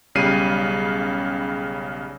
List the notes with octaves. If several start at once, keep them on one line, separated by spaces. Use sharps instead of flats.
B1 C#3 G3 C7 D#7